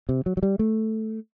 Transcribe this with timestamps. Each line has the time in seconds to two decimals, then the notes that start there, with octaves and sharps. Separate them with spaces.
0.09 C3
0.26 F#3
0.37 F#3
0.43 G3
0.59 A3